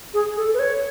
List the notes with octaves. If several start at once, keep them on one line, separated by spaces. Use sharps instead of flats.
G#4
A4
B4
C#5